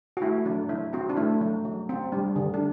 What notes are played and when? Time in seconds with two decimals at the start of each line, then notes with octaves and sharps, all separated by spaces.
0.17 F#4
0.22 A3 E4
0.45 F#3 D4
0.69 F#3 E4
0.93 C4 F#4
1.10 D4
1.17 A3 E4
1.41 F#3
1.65 F#3
1.89 C4
2.12 G3 D4
2.36 D3
2.54 D4